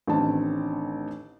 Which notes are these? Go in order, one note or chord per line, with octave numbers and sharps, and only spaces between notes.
A1 D3 D#3 C4 A5